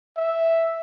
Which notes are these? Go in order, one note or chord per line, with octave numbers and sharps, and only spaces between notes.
E5